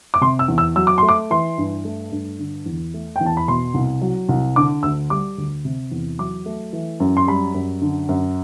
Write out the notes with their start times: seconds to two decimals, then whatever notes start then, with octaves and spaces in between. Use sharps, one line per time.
0.14 D6
0.21 C3 C6
0.39 E6
0.48 E2
0.58 E6
0.76 F#3 E6
0.87 D6
0.98 A3 C6
1.09 D6
1.31 E3 C6
1.58 G2
1.85 A3
2.12 G2
2.39 D3
2.66 E2
2.94 A3
3.16 G5
3.21 E2
3.26 A5
3.37 B5
3.48 B2 C6
3.74 C2
4.02 F#3
4.29 C2
4.56 D3 D6
4.83 D2 E6
5.10 G3 D6
5.38 D2
5.65 C3
5.91 E2
6.19 F#3 D6
6.46 A3
6.73 E3
7.00 F#2
7.17 C6
7.27 G3 B5
7.54 F#2
7.82 D3
8.09 F#2